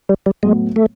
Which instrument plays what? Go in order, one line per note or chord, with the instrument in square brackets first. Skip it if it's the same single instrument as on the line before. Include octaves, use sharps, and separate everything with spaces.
[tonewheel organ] G3
G3
[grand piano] A2 F#3 B3 [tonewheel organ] G#3
[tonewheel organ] A3